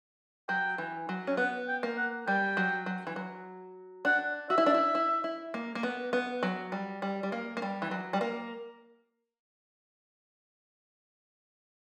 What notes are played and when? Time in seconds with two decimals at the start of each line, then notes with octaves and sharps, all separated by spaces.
0.49 F#3 G5
0.78 E3
1.09 F#3
1.27 C#4
1.37 B3 F#5
1.68 G5
1.83 A#3
1.97 F#5
2.27 G3 G5
2.57 F#3
2.86 F#3
3.07 E3
3.16 F#3
4.05 D4 F#5
4.50 F#4 E5
4.58 E4
4.66 D4
4.74 E4
4.95 E4
5.24 E4
5.54 A#3
5.75 A#3
5.83 B3
6.13 B3
6.43 F#3
6.72 G3
7.02 G3
7.23 G3
7.32 A#3
7.57 A#3
7.62 G3
7.82 E3
7.91 F#3
8.13 G3
8.21 A#3